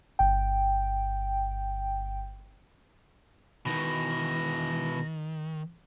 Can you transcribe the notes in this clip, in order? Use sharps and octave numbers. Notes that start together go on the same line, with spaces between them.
G1 G5
B2 D#3 E3 A#6